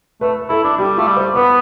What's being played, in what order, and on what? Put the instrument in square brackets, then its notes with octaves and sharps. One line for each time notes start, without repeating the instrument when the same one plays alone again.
[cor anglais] A3 [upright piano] B4
[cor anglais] E4 [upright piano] A4
[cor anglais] D4
[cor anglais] G3 [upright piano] G4
[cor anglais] A3 [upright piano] F4
[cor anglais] G3
[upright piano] C5
[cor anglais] B3 [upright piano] B4